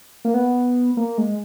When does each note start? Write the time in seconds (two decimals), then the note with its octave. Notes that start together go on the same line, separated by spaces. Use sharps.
0.25 A#3
0.34 B3
0.97 A#3
1.18 G#3